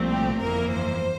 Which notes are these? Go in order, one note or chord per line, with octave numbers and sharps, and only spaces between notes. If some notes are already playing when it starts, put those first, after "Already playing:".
Already playing: C2 A#2 F3 A3 C4
G4
G1 F2 E3 A#3 A#4
C5